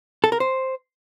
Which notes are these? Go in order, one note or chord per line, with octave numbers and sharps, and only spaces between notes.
A4
A#4
C5